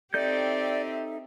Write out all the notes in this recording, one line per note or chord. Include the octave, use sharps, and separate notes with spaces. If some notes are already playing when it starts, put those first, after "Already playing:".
C4 D#4 G4 A4 D5 E5 G6